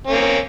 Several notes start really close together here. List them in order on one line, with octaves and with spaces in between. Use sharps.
C#4 A#3 C4